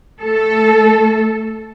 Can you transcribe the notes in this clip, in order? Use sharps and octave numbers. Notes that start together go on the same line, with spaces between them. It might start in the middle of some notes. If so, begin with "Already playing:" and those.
A3 A4